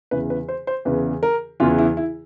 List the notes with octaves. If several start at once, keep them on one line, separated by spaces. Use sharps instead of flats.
E2 C#3 E3 B4
B4
C5
C5
E2 C#3 E3 B4
A#4
E2 C#3 E3 F4
E4
E4